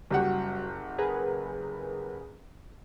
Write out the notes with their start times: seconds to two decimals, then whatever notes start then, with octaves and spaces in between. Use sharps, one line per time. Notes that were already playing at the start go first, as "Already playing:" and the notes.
0.11 F#1 G3 F#4 G4 F#5
0.98 G#4 A#4 B4